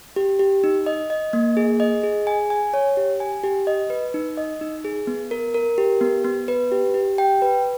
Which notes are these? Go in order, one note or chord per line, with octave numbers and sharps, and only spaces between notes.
G4
G4
D#4
D#5
D#5
A#3
G#4
D#5
G#4
G#5
G#5
C#5
G4
G#5
G4
D#5
B4
D#4
D#5
D#4
G#4
B3
A#4
A#4
G4
B3
B3
B4
G4
G4
G5
B4